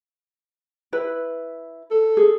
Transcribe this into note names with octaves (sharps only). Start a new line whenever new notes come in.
E4 B4
A4
G#4